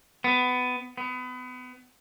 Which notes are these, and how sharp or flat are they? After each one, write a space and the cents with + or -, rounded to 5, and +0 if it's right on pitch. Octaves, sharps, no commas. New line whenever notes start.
B3 +20
B3 +30